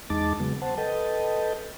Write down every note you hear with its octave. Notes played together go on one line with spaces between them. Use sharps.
E2 G#3 D#4 A5 D6 A6
C#3 F#3 G#3 B3
C5 F#5 A5
A4 B4 D#5 G5 A5